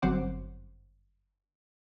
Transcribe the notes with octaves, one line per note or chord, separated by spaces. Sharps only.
G1 F#2 C4 C5 F#5 D6